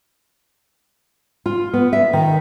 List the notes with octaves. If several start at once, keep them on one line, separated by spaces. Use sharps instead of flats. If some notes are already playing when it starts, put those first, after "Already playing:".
F4
B3
E5
D#3